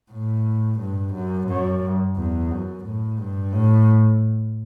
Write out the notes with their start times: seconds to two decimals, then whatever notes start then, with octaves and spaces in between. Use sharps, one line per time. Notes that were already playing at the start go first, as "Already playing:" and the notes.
0.12 A2
0.80 G2
1.14 F#2
1.49 F#2
2.17 E2
2.51 F#2
2.85 A2
3.18 G2
3.53 A2